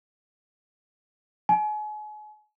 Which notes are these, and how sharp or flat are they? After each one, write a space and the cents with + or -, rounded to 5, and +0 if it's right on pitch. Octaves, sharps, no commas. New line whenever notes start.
G#5 +35